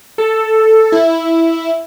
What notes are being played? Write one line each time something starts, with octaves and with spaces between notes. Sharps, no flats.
A4
E4